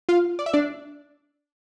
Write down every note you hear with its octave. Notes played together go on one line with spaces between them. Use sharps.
F4 F5
D5
E5
D4 D5